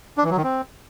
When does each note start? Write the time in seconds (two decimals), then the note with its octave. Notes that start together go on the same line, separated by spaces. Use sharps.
0.17 D4
0.24 E3
0.31 F#3
0.37 D#3
0.44 C4